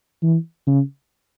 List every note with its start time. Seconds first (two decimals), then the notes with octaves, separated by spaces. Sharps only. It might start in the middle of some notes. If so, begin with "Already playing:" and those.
0.23 E3
0.67 C#3